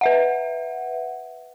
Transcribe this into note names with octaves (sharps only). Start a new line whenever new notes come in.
B4 E5 F#5